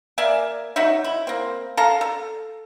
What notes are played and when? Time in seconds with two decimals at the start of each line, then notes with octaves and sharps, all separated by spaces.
0.18 A#3 D5 E5 G#5
0.76 F#3 D#4 C#5 E5
1.04 E4
1.27 A#3 C4
1.77 A4 F5 A5 A#5
2.01 A4